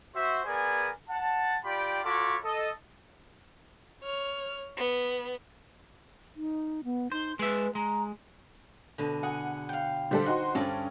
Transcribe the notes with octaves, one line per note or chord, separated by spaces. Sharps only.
F#4 C5 E5
B3 G#4 A#4 D5 G#5
F#5 A5
F4 G4 D5 G5 B5
F4 F#4 A4 C#5 B5 D6
A4 D#5
C#5 F6
B3
D#4
B3
D#4 C5
G#3 B4 E5
G#3 A#5
B2 D3
G#4 F#5
F5 G5
D3 G3 A4 C5
D#4 F#4 F#5 C6
G2 C#4 A4 D5